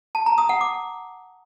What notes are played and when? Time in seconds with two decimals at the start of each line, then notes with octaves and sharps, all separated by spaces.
0.15 A5
0.26 A#5
0.38 D#6
0.49 F#5
0.61 D6